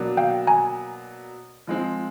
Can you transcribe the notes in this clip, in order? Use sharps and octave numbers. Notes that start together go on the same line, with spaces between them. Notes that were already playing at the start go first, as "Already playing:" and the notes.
Already playing: B2 F#3 A#3 D4
F5 G5
G#5 A#5
F3 G#3 C4